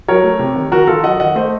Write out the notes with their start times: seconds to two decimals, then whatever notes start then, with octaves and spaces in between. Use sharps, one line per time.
0.08 F#3 A#4 C#5
0.24 A3
0.39 C3
0.56 D#3
0.72 D#3 F#4 A#4
0.88 D#3 F4 A4
1.04 F#3 D#5 F#5
1.20 D#3 D#5 F#5
1.35 A3 C5 D#5